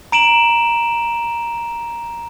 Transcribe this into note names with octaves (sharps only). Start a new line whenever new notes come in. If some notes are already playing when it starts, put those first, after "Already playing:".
A#5 D7 E7 F#7